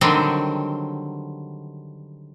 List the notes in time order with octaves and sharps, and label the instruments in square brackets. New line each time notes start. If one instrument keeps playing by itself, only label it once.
[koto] D3 D#3 F#3 G3 C4